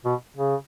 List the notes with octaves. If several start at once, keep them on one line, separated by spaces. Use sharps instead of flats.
B2
C#3